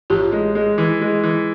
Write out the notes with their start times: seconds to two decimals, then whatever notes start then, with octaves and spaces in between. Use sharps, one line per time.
0.10 A1 F4 G4
0.32 G#3
0.55 G#3
0.78 E3
1.01 G#3
1.23 E3